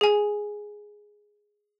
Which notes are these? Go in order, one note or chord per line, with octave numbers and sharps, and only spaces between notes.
G#4 G#5